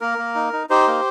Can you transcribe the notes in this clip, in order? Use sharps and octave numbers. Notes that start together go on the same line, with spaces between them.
A#3 A#4
A#3
D#4
D#4
D#4 G4 C5
A#3